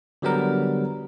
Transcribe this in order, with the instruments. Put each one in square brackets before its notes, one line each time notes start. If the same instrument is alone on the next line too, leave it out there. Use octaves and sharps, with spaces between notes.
[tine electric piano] D3 F#3 G3 B3 A#4